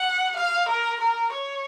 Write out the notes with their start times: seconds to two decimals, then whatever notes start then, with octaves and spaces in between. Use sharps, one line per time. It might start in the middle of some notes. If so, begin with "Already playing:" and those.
Already playing: F#5
0.37 F5
0.69 A#4
1.00 A#4
1.33 C#5